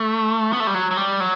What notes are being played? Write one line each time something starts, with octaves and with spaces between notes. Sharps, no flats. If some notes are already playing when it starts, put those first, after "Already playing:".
Already playing: A3
B3
A3
G3
F#3
F#3
G3
F#3